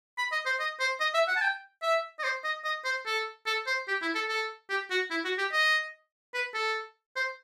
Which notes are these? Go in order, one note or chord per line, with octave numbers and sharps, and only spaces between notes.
B5
D#5
C5
D#5
C5
D#5
E5
F#5
A5
G5
E5
D#5
C5
D#5
D#5
C5
A4
A4
C5
G4
E4
A4
A4
G4
F#4
E4
F#4
G4
D#5
B4
A4
C5